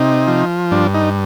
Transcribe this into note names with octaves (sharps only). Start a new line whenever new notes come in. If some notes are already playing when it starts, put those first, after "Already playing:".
Already playing: C3 D#4
F3
G2 D4
D#4